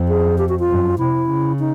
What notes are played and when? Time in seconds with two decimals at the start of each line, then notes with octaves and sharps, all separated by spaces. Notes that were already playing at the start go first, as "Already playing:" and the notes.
Already playing: F2
0.08 G#4
0.38 G4
0.49 F#4
0.59 F4
0.69 F#2
0.98 C3 E4
1.29 C#3
1.59 D#4